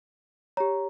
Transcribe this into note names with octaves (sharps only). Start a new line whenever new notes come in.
G4 C#5 A#5